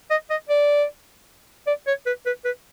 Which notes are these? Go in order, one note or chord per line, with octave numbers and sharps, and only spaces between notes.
D#5
D#5
D5
D5
C#5
B4
B4
B4